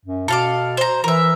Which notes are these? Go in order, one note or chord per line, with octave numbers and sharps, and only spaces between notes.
F#2
B2 A4 F5 D6
C5 A#5
E3 A#4 E5